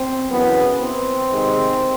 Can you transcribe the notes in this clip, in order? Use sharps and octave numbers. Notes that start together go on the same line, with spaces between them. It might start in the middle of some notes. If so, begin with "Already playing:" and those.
Already playing: C4
F#2 C#3 E3 B3
C4
C3 D#3 G#3